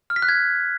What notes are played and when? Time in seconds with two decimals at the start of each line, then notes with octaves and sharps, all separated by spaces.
0.10 F6
0.16 B6
0.22 F#6
0.29 G#6